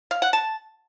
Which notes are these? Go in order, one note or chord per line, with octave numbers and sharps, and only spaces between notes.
F5
F#5
A5